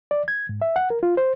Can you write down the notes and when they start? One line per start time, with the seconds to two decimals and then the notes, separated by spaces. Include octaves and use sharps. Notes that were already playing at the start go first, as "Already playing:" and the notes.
0.11 D5
0.28 G#6
0.49 G#2
0.62 E5
0.76 F#5
0.90 A#4
1.03 F4
1.17 C5